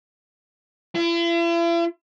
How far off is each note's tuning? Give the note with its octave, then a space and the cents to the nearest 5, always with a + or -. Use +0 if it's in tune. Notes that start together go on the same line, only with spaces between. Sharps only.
E4 +45